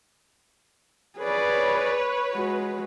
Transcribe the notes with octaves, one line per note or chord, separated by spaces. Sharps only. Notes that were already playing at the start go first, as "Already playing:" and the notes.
G#4 B4 C#5 D5
G#3 F#4